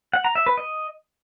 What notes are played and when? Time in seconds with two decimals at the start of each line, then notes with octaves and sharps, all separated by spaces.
0.13 F#5
0.24 A#5
0.35 E5
0.46 B4
0.57 D#5